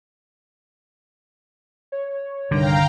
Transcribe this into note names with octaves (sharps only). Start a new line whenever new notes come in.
C#5
C2 G2 D3 D#3 F5 G5 A#5